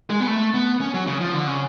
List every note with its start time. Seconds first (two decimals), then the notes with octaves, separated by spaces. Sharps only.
0.10 G#3
0.20 B3
0.28 A3
0.54 B3
0.81 C#4
0.94 F#3
1.07 C#3
1.21 F3
1.34 D3
1.47 C#3